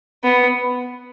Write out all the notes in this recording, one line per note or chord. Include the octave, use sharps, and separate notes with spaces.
B3